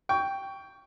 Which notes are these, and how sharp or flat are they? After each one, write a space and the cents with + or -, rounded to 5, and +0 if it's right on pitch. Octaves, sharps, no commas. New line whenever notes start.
G5 +0 C#6 +20